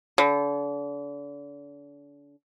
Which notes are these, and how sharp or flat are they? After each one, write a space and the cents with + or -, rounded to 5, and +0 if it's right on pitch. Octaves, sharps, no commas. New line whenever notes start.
D3 -40